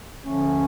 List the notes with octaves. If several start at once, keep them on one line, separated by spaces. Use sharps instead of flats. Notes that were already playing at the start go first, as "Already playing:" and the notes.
D2 D3 F3 A3 C#4